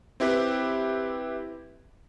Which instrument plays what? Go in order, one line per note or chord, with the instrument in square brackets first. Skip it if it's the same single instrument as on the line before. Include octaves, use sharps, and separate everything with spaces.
[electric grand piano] C4 E4 G4 B4